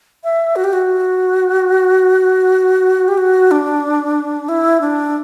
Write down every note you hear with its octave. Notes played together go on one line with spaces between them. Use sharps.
E5
F#4
G4
F#4
G4
F#4
D4
E4
D4